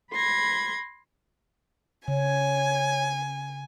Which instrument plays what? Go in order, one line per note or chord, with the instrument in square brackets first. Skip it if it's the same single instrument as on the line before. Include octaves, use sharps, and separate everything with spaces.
[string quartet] B5 C6 G#6 A#6
[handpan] C#3 [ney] C#5 [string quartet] G#5